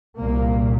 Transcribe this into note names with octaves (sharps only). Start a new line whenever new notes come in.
C2 A#2 A#3